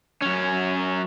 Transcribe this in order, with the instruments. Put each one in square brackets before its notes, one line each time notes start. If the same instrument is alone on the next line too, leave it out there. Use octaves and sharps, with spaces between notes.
[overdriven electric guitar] F#2 C#4